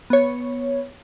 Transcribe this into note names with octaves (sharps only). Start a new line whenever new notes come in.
B3 C#5